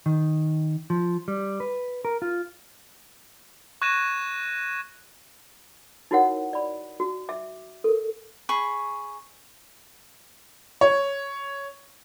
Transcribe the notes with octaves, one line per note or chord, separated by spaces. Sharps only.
D#3
F3
G3
B4
A#4
F4
C#6 F#6 G#6 A#6 D#7 E7
D#4 E4 F#4 A#4 C#5 F#5
D5 B5
F#4
E5 D6
A4 A#4
G#4 B5 C#6
C#5